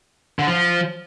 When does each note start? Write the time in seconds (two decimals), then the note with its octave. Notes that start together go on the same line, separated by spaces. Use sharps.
0.39 D3
0.47 F3